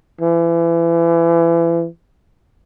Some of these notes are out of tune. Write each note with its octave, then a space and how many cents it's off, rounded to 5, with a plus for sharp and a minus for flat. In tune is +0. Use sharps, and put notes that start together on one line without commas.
E3 +30